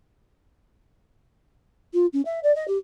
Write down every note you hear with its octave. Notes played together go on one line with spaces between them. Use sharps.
F4
C#4
E5
D5
D#5
G4